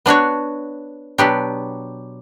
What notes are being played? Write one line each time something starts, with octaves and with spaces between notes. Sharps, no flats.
B3 D4 F#4 C#5
B2 F#3 B3 D4 G4